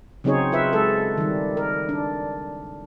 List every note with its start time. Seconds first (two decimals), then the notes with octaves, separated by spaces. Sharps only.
0.24 C#3 F#3 C4 D#4 G#4 C#5
0.52 F4 B4 E5
0.73 G#3 A4
1.17 D#3 G3
1.57 A#4
1.89 D4